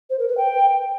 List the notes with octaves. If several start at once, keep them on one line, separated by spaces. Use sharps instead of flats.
C5
A#4
B4
G5